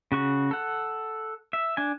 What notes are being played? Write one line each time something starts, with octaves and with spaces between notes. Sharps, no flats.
C#3 F#4 C#6
A4 F#5
E5
D4 G#5